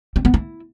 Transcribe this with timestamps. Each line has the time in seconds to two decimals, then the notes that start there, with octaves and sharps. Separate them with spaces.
0.16 C4
0.25 B3
0.34 E4